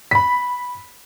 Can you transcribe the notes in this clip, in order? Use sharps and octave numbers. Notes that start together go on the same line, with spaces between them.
B5 B6